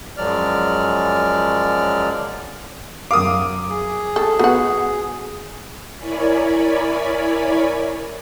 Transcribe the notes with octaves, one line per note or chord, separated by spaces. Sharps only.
F#2 F3 F#3 G#3 D5 F6
F#2 A#4 F5 D6 D#6
G#4
A4
B3 F#4 F#5
E4 A#4 C#5 D5 G#5 B5